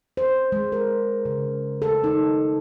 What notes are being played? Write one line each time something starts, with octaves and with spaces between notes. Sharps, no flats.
C5
G#3
A#4
C#3
A4
D#4